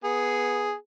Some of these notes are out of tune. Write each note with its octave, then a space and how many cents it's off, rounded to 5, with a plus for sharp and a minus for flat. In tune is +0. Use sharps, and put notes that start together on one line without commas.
B3 -10 G#4 +0